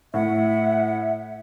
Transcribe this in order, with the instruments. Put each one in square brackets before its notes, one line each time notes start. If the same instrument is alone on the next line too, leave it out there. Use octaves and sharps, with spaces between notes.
[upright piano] A2 [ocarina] E5 [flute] F#5